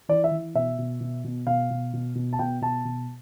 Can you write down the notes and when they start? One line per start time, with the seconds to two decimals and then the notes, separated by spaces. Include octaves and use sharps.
0.09 E3 D5
0.24 E5
0.31 E3
0.55 B2 E5
0.78 B2
1.01 B2
1.24 B2
1.46 B2 F5
1.71 B2
1.93 B2
2.15 B2
2.33 A5
2.39 B2 G5
2.61 B2 A5
2.85 B2